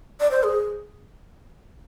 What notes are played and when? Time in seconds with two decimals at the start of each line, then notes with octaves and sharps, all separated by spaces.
0.20 D5
0.31 C5
0.43 G#4